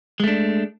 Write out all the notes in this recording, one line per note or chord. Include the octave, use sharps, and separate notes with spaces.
G#3 A3 D4